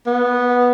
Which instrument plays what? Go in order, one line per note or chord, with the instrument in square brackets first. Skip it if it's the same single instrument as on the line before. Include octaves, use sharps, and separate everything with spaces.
[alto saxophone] B3